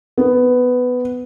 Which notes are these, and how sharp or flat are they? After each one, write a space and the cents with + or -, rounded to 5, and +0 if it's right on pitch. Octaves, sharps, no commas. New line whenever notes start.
B3 +10